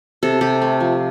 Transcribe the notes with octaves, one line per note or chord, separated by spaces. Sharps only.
C3 A4
C3 G4
A3
F3